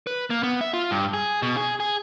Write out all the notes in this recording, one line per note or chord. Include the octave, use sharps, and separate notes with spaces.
B4
A#3
B3
E5
F4
G2
G#4
B2
G#4
G#4